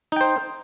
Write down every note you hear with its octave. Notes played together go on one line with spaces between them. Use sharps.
D#4 C5 G5